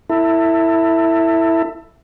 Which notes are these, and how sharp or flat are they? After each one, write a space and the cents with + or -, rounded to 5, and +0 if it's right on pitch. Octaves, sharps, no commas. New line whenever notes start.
E4 +0 A4 +30